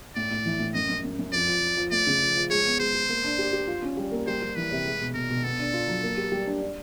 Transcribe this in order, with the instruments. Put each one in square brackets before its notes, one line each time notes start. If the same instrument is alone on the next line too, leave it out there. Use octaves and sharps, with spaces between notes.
[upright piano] A2 [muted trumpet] D5
[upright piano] A2
E3
A2
[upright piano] F#2 [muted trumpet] D#5
[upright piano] F#2
F#2
F#2
[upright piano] F2 [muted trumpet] D5
[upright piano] F3
F3
F3
[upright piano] A3 [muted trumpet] D5
[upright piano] C#3
F3
F3
[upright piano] G#3 [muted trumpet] C#5
[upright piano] B3
[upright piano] G#3 [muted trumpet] C5
[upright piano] G#3
A#3
D4
G4
G4
F4
C#4
G3
A#3
[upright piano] G3 [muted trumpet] C5
[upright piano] G3
[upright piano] E3 [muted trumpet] B4
[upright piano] C3
G#3
B2
[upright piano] B2 [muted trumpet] A#4
[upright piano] B2
[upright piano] B3 [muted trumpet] A4
[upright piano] D4
F4
F#3
A#3
G4
G3
D4
D4